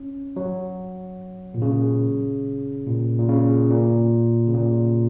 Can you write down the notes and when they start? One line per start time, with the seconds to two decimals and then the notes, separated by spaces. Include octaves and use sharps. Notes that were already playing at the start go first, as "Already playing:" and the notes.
Already playing: C#4
0.36 F#3
1.54 A#2
1.62 C#3
2.87 A#2
3.19 A#2
3.29 C#3
3.70 A#2
4.47 C#3
4.54 A#2